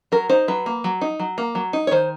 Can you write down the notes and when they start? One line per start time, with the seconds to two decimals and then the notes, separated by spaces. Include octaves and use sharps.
0.12 F#3 A#4
0.29 D#4 C5
0.48 F#3 B4
0.66 A#3
0.84 F#3
1.01 D#4
1.20 F#3
1.38 A#3
1.55 F#3
1.73 D#4
1.87 C#5
1.91 D#3 C5